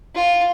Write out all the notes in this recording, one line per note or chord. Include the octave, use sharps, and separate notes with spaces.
F4